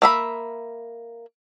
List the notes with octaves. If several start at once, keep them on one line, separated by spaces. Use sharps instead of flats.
A#3 E5 B5